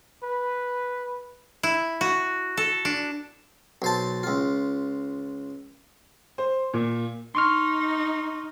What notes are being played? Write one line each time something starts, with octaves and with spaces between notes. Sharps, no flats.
B4
E4
F#4
A4
D4
B1 C5 A5
C#2 F4
C5
A#2
D#4 C6 C#6 F6